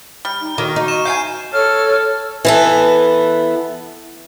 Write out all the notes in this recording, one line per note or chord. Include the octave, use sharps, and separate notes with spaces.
G3 F6
D#4
D#3 A#3 F#4
D#4 F#4
C#6 D#7 E7
F5 G5 G#5 G6 C7 D#7
A4 C#5 F6
E3 B3 A4